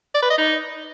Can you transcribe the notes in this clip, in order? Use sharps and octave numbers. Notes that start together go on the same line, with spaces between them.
D5
B4
D#5
D#4